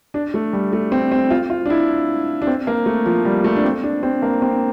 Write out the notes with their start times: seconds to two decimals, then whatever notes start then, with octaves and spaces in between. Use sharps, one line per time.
0.14 D4
0.34 A3
0.53 G3
0.73 A3
0.92 C4
1.12 C4
1.31 F4
1.50 F4
1.66 D4
1.70 E4
2.42 D4
2.47 C4
2.67 A#3
2.86 A3
3.06 F3
3.25 G3
3.44 A3
3.56 D4
3.64 C4
3.83 D4
4.03 C4
4.22 A#3
4.42 C4